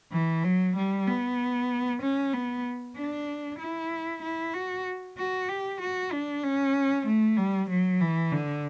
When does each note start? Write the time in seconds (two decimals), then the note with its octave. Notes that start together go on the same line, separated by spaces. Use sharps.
0.12 E3
0.44 F#3
0.76 G3
1.07 B3
2.02 C#4
2.33 B3
2.96 D4
3.60 E4
4.22 E4
4.54 F#4
5.17 F#4
5.49 G4
5.81 F#4
6.12 D4
6.43 C#4
7.06 A3
7.37 G3
7.70 F#3
8.01 E3
8.32 D3